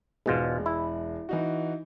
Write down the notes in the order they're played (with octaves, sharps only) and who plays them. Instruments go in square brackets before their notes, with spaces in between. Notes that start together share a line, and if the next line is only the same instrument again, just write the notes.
[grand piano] E1 G#3 [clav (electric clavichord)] G#2 B2 F4
[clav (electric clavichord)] E4
[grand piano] E3 D#4 F#4